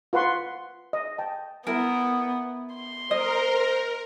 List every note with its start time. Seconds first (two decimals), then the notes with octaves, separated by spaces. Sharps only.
0.13 F4 B4 F#5 C6 C#6
0.93 D#5
1.18 G5 A5
1.67 B3 E4 A#4
2.75 C6
3.11 A#4 C5 D#5